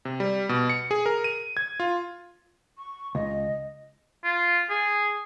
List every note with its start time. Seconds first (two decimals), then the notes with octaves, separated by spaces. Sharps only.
0.05 C3
0.20 G3
0.49 B2
0.70 C#7
0.91 G#4
1.06 A#4
1.24 D#7
1.57 G#6
1.80 F4
2.78 C#6
3.15 C#2 D#5
4.24 F4
4.70 G#4